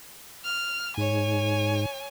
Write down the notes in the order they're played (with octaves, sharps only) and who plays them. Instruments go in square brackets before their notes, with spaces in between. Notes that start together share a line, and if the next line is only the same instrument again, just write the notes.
[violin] F6
[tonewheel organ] G#2 [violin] C#5 G#5